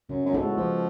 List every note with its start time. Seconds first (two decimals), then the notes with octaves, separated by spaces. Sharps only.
0.09 F#2 C#3
0.25 F#2
0.33 G#2 G#3 B3 F#4 A4
0.41 A2
0.57 C#3 F3